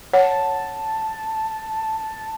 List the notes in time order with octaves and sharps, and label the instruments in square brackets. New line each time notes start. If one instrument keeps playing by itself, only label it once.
[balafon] C#5 [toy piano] F#5 [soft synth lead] A5